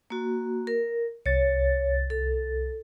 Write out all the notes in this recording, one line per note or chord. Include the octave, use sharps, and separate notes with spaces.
A#3 F#4
A#4
C2 C#5 A6
A4